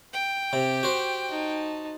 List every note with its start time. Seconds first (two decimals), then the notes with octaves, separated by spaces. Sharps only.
0.13 G5
0.53 C3 G4
0.83 F#4 C5
1.29 D#4 A5